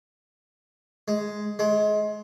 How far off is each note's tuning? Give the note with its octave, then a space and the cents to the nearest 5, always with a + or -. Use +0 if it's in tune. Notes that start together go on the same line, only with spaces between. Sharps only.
G#3 +5
G#3 +25